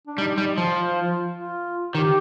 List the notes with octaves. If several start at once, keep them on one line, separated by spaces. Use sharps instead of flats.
D4
G3 D#4
G3
F3
F4
F4
D#3 G4